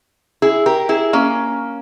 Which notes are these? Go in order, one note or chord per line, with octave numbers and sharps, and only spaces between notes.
E4 G#4
G4 A#4
E4 G#4
A#3 C#4